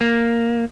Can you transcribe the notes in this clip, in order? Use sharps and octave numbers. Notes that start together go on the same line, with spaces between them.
A#3